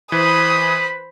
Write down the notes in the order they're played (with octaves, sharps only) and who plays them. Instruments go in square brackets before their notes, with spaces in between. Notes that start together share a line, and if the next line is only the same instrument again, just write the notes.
[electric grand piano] E3 [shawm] B4 [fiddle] C5 B5 [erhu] D#6